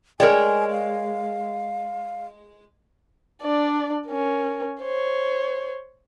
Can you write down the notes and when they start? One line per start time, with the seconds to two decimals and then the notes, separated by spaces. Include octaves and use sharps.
0.20 G#3 A#4 C#5 D5 G5 G#5
0.70 F5
3.42 D4 D5
4.07 C#4 A#4
4.80 C5 C#5